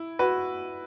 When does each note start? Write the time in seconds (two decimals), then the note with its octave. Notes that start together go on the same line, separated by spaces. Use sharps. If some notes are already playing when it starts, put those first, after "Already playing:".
Already playing: E4
0.19 F#4 B4